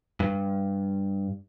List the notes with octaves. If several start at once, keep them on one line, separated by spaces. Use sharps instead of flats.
G2